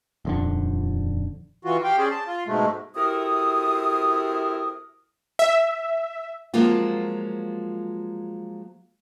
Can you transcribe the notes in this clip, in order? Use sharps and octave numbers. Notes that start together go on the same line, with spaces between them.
D#1 F2 D3
E3 F4 F#4
G4 F5 G5
C#4 G#4 C5 D5
A5
F4
G#2 B2 G#3 A3
C3 E4 F#4 A4 A#4 D#6
E5
F3 F#3 G#3 A#3 C4 F4